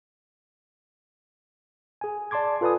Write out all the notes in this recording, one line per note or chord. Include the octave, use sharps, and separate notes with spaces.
G#4 G#5
D5 A5 C6 D6 G#6
F4 A4 B4 D5 G#5 D#6